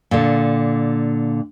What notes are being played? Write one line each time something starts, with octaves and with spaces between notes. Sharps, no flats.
A#2 D3